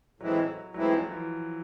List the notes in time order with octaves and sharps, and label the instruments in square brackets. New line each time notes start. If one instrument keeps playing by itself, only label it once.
[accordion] A2 E3 G#3 C4 E4 [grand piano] F#3
[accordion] A2 E3 G#3 C4 E4 [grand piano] F#3
[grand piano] F3
E3